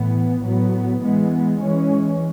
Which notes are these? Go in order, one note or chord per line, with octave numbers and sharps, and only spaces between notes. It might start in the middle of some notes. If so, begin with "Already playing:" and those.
Already playing: A2 E3 B3
A2 F#3 B3
E3 G#3 B3
E3 G#3 C#4